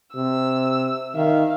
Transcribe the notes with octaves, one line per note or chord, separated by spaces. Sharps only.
C3 E6
D#3 E5 F5